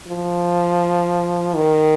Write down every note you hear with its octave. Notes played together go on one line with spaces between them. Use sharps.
F3
D#3